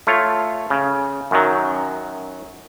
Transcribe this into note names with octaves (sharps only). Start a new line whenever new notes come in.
A3 F4 C#5
C#3
F#2 D#3 F#3